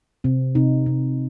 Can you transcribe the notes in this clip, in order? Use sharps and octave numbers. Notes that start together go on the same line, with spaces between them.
C3 C4
C3 D#4
C3